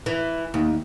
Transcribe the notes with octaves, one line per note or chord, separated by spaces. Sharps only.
E3
D#2